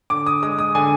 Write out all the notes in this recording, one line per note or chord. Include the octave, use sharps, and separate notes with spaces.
D3 D6
D#6
G#3 D#6
D#6
D3 G#5